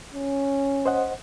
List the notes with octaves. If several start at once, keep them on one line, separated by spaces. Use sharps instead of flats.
C#4
C5 D#5 F#5